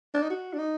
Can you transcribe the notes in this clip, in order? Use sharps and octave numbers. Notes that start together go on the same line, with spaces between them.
D4
D#4
F#4
D4
D#4